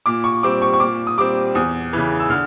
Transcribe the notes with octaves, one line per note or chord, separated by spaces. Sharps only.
A#2 D6
C#6
G3 C4 D6
C#6
C#6
A#2 D6
D#6
G3 C4 D6
E2 D#6
C#3 E3
E6
D3 F6